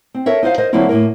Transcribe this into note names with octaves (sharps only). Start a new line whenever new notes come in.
C4
A4 A#4 C#5 E5
D#4 F4 C5 F5
A#4 C5 D#5
D3 F#3 A#3 C4 E4 F4
A2 A#3 A#4